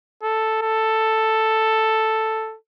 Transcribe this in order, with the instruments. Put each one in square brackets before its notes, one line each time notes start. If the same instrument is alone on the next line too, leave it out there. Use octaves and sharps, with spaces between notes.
[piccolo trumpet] A4
A4